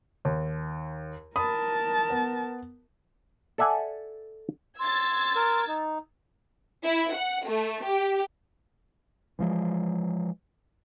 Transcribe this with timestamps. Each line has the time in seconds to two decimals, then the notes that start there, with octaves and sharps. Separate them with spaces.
0.25 D#2
1.36 A#4 A5 B5 D#6
2.10 B3
3.58 A4 D5 E5 F#5 G#5
4.80 C6 E6 G#6 A6
5.36 A#4
5.68 D#4
6.83 E4
7.14 F#5
7.46 A3
7.84 G4
9.39 E3 F3 G#3